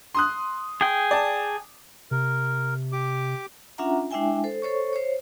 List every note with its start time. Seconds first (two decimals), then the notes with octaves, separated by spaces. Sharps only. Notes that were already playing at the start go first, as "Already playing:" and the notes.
0.15 C6 D#6 F#6
0.81 G#4 G5
1.11 D5 A5
2.11 C3 A#4
2.92 G4 D6
3.78 C#4 D4 F4 E5 F#5 A#5
4.11 G#3 D4 E4 E5 G5 G#5
4.44 A4 C5
4.62 A4 C5 C#5 C#6
4.93 C5 C#5